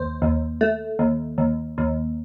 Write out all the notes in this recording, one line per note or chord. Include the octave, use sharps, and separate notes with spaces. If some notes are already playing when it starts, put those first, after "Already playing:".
Already playing: D#2 C5
D#2
A3
D#2
D#2
D#2